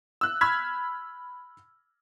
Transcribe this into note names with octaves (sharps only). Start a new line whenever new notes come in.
E6 F#6
B5 E6 F6 G#6 B6